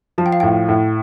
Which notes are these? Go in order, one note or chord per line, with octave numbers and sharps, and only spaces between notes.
F3 A5
G5
F5
A2 G5
A2